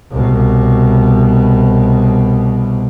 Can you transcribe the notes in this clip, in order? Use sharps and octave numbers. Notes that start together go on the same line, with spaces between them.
C2 B2